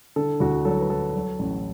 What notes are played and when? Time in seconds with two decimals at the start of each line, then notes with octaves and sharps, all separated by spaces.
0.16 D3 A4
0.40 D2 F#4
0.65 F#3 A4
0.81 B4
0.89 F#3 A4
1.15 F#3
1.39 A1